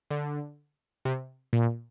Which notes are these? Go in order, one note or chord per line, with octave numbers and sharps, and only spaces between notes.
D3
C3
A#2